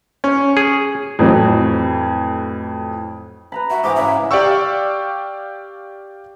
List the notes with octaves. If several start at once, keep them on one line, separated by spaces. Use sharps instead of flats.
C#4
G#4
F2 A2 E3 F#3
B4 A#5 B5
F#4 E5
G#2 E3 A#5 D6
G#2 C#3 E5 G#5
G4 D5 F5 G5 C#6 E6